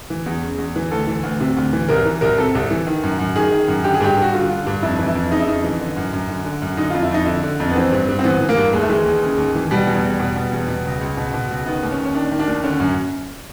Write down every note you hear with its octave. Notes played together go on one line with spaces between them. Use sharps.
E3
E2
C#3
E2
E3
D2 A4
E3
D2
C3
D2
E3
C2 A#4
E3
C2 A#4
C3 A4
C2
E3
D#3
F#2
F#2
D#3 G#4
D#3
F#2
D3 G4
G#4
G2 G4
G2 F#4
D3 F4
D3
G2
F2 E4
E3
E4
F2
C#3 D#4
E4
F2 D#4
E3
D3
F#2
F#2
D3
D3
F#2
D3 D#4
F4
F2
E4
F2 D#4
D3 E4
D3
F2
B3
E3 C4
G2
G2
C4
E3 B3
E3
A#3
G2
D#2 G#3
A3
E3 G#3
D#2
C#3
D#2
E3
B2 G3
E2
E2
B2
B2
E2
B2
C#2
C#2
B2
B2
C#2
D#3 B3
D#2
C#4
D#2
C#4
D#3 D4
D#3
D4
D#2
D3 C#4
F#2